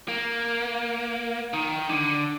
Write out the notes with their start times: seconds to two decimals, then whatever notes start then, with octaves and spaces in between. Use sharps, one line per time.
0.08 A#3
1.53 D#3
1.90 D3